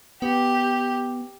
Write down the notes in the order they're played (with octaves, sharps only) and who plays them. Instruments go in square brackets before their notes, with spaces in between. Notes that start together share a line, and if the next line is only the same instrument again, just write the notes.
[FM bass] B3 [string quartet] G4